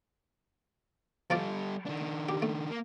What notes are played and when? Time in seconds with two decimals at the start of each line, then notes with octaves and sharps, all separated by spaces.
1.30 F3 G3 F4 A4 D5
1.86 D#3 D4
2.29 G4
2.42 A3
2.70 A#3